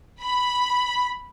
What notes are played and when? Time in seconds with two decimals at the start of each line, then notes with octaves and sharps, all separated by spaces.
0.21 B5